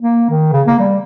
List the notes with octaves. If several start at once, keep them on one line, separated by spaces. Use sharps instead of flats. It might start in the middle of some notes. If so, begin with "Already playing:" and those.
A#3
D#3
C#3
A#3
G3